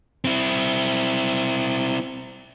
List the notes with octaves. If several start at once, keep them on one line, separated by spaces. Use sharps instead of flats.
C4 E4